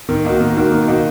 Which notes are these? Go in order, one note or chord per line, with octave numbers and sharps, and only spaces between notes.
D#3
A#3 D#4 F#4
D#3
A#3 D#4 F#4
D#3
A#3 D#4 F#4